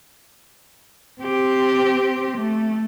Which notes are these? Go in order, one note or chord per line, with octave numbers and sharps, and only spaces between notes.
C4 G4
A3